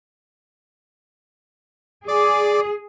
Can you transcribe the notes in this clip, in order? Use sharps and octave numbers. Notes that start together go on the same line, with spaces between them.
G#4 D5 D6